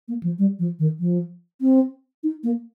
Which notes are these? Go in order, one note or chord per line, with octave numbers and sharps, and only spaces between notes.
A#3
F3
G3
F3
D#3
F3
C4
D#4
A#3